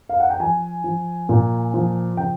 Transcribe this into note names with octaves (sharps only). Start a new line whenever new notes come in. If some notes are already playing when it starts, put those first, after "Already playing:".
F5
F#5
G5
F3 G#5
F3
A#2
F3
C#3 G5